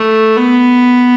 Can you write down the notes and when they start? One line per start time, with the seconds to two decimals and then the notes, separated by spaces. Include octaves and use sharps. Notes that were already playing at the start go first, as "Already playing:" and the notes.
Already playing: A3
0.36 B3